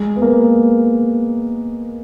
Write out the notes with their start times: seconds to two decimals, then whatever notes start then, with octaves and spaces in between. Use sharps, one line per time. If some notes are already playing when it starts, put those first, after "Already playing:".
Already playing: G#3
0.16 B3
0.22 A#3